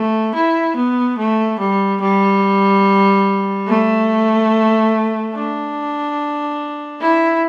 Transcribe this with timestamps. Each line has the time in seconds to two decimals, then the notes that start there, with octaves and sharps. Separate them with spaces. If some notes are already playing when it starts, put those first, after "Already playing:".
Already playing: A3
0.35 E4
0.76 B3
1.18 A3
1.59 G3
2.01 G3
3.68 A3
5.35 D4
7.01 E4